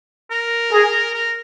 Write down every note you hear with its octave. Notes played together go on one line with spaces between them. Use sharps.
A#4
G#4
A#4